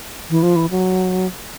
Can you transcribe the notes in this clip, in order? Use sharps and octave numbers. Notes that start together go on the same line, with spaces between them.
E3
F3
E3
F#3